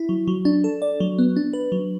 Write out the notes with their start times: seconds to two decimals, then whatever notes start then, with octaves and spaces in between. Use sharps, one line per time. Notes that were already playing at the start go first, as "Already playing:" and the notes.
Already playing: E4
0.09 F#3
0.28 F#3
0.45 D4
0.64 A4
0.82 D5
1.00 F#3
1.19 B3
1.36 D4
1.53 B4
1.72 F#3